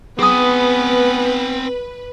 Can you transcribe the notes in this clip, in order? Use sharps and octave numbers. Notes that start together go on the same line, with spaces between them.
B3 C4 G#4 B4 G#5 D#6